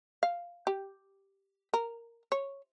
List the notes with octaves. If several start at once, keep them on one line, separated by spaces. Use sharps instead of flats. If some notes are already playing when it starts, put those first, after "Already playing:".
F5
G4
A#4
C#5